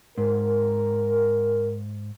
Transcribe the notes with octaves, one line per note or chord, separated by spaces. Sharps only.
G#2 A#4